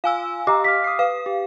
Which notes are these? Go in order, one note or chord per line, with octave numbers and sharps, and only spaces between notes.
F4 F5 G#5 E6
G4 D#5 A#5 D6
F5 D6 F6 B6
D#6 C7
B4 F5
G4